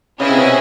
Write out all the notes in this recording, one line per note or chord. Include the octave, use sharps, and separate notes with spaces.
C#3 C#4 E4 G#4 B4 D#5
C3
B2